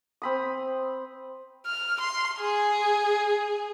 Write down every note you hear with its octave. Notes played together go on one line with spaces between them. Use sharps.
C4 B5 D#6
F6
C6
G#4